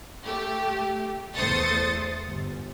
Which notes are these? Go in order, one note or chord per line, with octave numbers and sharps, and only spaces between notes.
A3 G4
E2 A3 C5 D#6 A6 C#7
G1